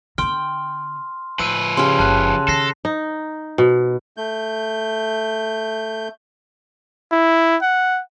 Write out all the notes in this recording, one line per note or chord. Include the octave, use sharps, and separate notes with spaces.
D3 B3 G5 C6 F6
A2 F3 B4 E6 D#7
C#3 G4 C6 F6
F#1 A5 C6 F#6
D#3 A4 A5 A#6 C7
D#4
B2
A3 G6
E4
F#5